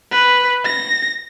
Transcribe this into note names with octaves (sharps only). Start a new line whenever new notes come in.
B4
A#6